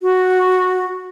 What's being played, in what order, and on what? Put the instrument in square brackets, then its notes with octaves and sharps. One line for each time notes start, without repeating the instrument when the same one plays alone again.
[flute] F#4